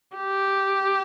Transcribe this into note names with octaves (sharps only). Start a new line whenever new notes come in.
G4